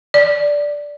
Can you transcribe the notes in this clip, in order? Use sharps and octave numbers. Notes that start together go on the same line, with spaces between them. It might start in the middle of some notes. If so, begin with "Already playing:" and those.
D5